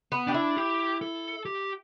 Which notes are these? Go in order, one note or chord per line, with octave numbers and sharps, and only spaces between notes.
B3
D4 G4
E4
G4
A4
G4